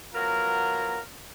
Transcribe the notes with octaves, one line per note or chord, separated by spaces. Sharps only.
F#3 B3 F4 A#4